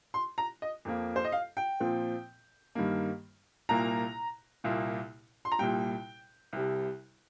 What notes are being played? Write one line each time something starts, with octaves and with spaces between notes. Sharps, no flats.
C6
A#5
D#5
F2 F3 A#3
C5
D#5
F5
G5
A#2 F3 C4
G2 D#3 G3 A#3
C2 A#2 A#3 A#5
C2 A#2 A#3
C6
A#5
C2 A#2 G3 G5
C2 C3 G3